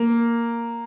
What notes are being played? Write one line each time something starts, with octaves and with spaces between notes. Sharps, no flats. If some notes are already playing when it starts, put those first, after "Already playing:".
Already playing: A#3